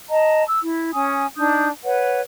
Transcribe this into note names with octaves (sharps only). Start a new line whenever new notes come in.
D#5 A5 A#5
E6
E4
C#4 G#5 D#6
D4 D#4 D#6 G6
B4 C#5 F#5